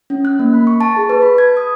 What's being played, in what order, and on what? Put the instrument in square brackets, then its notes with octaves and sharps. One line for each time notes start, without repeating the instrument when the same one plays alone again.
[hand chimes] C#4
F#6
A#3
B5
C#6
A5
G#4
B4
B5
G#6
D#6